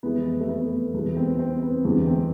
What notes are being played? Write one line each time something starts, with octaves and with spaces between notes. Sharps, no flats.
F2 E3 G#3 B3
A3
B3
E2 B2 G#3 B3
C4
C4
B3
E2 D3 G#3 B3
C4